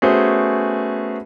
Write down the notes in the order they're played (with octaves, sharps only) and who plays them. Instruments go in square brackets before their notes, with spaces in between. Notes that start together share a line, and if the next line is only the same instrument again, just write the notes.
[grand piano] A3 B3 C#4 F#4 G#4 C5